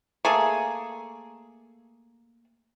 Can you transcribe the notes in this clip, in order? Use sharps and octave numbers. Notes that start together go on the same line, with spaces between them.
A3 A#3 G#4